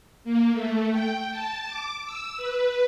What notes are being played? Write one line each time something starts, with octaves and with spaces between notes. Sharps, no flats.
A#3
A3
G5
A5
D6
E6
B4